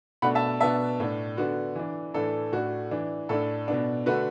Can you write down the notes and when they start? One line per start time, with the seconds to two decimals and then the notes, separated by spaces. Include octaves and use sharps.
0.22 B2 A3 D4 F#5 B5
0.35 E5 A5
0.60 B2 B3 D4 E5 A5
1.00 A2 A3 D4
1.37 D3 B3 D4 F#4
1.76 E3 D4
2.14 A2 E3 A3 D4 A4
2.52 A2 A3 D4 F#4
2.91 E3 D4
3.29 A2 A3 D4 A4
3.68 B2 B3 D4
4.06 D3 A3 D4 F#4 B4